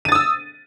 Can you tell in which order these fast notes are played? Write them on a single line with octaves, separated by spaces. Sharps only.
D#7 A6 D#6 E6